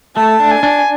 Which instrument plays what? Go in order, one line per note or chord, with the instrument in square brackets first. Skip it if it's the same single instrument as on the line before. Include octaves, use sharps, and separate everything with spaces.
[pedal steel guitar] A3 [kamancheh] A5
[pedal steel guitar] D4
[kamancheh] G#5
[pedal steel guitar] D4